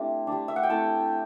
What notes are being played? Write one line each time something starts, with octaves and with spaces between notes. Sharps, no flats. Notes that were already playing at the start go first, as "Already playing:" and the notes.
Already playing: G3 A3 C4 D4 E4
G3 D4
E5
F#5
G5
A3 C4 E4 A5